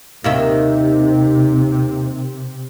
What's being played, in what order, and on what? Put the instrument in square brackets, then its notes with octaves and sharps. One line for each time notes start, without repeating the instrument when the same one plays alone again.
[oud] D#2 D#3 E5 [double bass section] C3